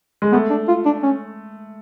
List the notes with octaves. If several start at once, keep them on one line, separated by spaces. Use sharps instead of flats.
G#3
A3 B3
D4
F4
D4
C#4